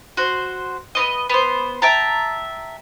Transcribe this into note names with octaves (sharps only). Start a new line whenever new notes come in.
F#4 C5
B3 C4 D#5
B3 C5
E5 G5 A5 A#5